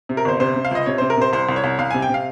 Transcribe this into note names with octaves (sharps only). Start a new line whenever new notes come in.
C3
A#4
G1 C5
C3 C5
C3
F5
C#2 D#5
C3 C#5
C3 C5
A#4
C3 C5
C2 C5
C2
C#5
C2
C2 F5
C3 G#5
G5
C3 F5